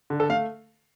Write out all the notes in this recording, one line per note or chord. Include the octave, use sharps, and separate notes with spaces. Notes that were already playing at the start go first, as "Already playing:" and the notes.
D3
A4
A3 F5